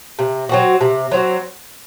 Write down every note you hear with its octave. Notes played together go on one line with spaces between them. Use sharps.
C3
F#3 C4 F#4
C3
F#3 C4 F#4